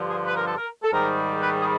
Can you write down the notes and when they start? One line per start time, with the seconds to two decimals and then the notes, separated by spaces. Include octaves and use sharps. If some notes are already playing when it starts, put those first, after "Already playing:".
Already playing: G2 D3 F3
0.10 G#4
0.26 B4
0.36 A#4
0.46 A4
0.57 A#4
0.83 A4
0.92 G#2 D#3 G3 A#4
1.41 B4
1.60 G#4